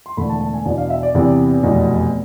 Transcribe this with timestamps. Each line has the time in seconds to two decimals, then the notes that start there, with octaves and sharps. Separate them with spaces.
0.06 C6
0.17 E1 E2 D3 A3 D4 B5
0.29 A5
0.41 A5
0.54 G#5
0.65 E2 B2 B3 D4 G#5
0.77 F5
0.90 E5
1.03 D5
1.14 E2 C3 E3 B3
1.63 F1 E2 B2